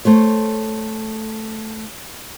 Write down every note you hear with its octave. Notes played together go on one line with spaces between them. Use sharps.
A3 C5 C#5